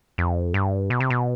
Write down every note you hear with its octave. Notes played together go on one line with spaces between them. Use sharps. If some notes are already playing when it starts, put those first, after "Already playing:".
F2
G2
B2
C3
B2